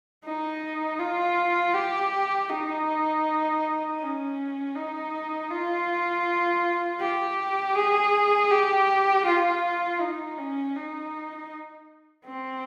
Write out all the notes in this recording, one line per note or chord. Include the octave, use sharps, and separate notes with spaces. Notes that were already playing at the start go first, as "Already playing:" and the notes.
D#4
F4
G4
D#4
C#4
D#4
F4
G4
G#4
G4
F4
D#4
C#4
D#4
C4